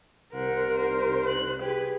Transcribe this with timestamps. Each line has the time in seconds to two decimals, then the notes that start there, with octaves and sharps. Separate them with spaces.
0.34 C2 A#4 C5 F#5
0.76 D#4 C5
1.28 F#6
1.62 G4 G#4 B4